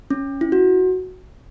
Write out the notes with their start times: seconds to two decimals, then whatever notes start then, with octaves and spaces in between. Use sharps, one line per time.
0.10 C#4
0.41 E4
0.52 F#4